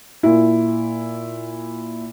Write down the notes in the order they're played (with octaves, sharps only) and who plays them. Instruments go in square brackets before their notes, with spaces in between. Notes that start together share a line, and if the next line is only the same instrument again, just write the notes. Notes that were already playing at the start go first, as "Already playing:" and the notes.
[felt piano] A#2 E4